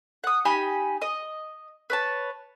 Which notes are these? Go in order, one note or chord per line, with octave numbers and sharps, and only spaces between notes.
F#5 D#6
D#4 G4 G#5 B5
D#5
B4 C#5 A5